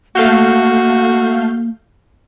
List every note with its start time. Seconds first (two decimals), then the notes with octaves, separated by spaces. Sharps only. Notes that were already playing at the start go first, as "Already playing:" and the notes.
0.15 A3 A#3 F#4 F5 G6